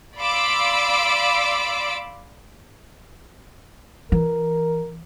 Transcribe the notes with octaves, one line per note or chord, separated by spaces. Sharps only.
D5 F5 B5 C6 D6 E6
E3 A#4